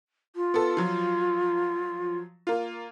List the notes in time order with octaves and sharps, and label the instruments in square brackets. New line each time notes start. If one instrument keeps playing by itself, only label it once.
[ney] F4
[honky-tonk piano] B3 A4
F3 F#3
A#3 F4